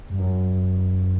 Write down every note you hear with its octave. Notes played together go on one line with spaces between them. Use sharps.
G2
F#2